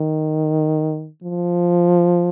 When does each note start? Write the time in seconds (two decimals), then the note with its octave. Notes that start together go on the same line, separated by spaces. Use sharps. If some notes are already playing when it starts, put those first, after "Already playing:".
Already playing: D#3
1.24 F3